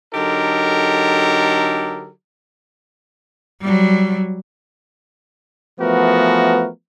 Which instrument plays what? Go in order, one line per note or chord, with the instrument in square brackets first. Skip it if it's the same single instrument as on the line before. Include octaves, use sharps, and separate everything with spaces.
[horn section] D3 F#3 D#4 G4 A4 A#4
[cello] F#3 G3
[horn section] E3 F3 A3 B3 F#4 A#4